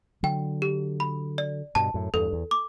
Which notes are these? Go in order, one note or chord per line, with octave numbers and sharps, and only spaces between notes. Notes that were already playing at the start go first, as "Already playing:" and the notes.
D3 F#3 G5
G4
B5
D5
G2 B2 A5
F#2 A2
E2 G2 A4
E2
D6